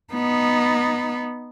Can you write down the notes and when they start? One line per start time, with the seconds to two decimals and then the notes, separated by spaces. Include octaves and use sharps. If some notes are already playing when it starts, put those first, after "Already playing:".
0.13 B3 D#4